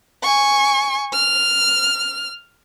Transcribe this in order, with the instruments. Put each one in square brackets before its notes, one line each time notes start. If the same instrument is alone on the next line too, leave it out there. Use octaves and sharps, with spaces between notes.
[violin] G#5 C#6
F6